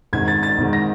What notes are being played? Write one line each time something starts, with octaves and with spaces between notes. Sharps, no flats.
G#1 G#2 D#3 G#6
A6
A6
G#1 G#2 D#3
A#6